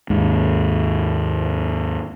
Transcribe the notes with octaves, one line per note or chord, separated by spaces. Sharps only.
D#2 G#2 G#3